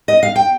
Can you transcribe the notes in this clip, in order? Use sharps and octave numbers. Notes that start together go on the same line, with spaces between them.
D#5
F5
G5